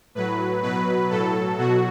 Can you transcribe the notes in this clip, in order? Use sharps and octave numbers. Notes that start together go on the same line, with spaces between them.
A2 F#3 B4
B2 F#3 B4
A2 F#3 A4
B2 F#3 F#4